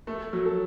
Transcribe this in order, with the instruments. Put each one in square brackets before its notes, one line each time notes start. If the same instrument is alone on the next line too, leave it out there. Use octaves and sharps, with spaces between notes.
[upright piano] A3 [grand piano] A4
[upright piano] F#3
[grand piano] A4